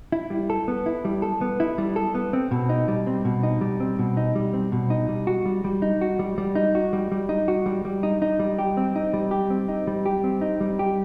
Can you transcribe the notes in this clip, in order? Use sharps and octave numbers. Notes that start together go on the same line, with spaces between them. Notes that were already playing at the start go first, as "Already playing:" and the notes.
E4
G3
A4
B3
E4
G3
A4
B3
E4
G3
A4
B3
C4
B2
D#4
G3
C4
B2
D#4
G3
C4
B2
D#4
G3
C4
B2
D#4
G3
F#4
G3
G3
D#4
F#4
G3
G3
D#4
F#4
G3
G3
D#4
F#4
G3
G3
D#4
D#4
G3
G4
C4
D#4
G3
G4
C4
D#4
G3
G4
C4
D#4
G3
G4